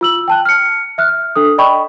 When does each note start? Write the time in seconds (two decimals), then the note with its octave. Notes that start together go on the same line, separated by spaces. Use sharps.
0.01 F4 E6 F#7
0.28 G5 A5 F#6
0.45 F6 C#7
0.98 E5 F6 F#6
1.36 D4 A4 D#6
1.58 D5 D#5 G5 B5 C#6